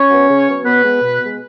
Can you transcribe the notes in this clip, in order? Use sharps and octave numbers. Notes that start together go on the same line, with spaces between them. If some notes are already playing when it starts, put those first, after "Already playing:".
Already playing: C#4 C#5
F#3 B3
C#3
F#3 B3
B2 B3 B4
G#3 B3
B2
G#3 B3